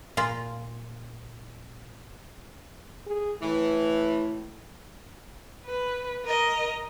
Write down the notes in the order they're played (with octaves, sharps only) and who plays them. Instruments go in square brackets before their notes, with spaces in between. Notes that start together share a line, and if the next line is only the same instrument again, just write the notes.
[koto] A#2 F4
[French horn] G#4
[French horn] A2 [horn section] E3
[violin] B4
A#4 D#5